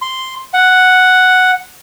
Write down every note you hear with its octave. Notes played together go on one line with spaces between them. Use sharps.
C6
F#5